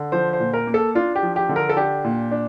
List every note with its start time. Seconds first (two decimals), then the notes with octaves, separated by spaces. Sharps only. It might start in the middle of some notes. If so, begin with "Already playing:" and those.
Already playing: D3
0.12 F3 C5
0.33 C5
0.40 A#2
0.53 A#4
0.67 A#3
0.74 A4
0.95 D4 F4
1.15 G4
1.23 F3
1.36 G4
1.49 D3
1.56 A#4
1.69 A4
1.77 D4 G4
2.04 A#2
2.31 D4